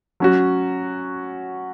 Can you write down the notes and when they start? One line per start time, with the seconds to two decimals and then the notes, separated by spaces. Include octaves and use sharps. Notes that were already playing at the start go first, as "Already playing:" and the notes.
0.20 F#3 C#4 F#4